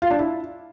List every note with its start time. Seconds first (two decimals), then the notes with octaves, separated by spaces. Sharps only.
0.02 F4
0.10 D4
0.19 E4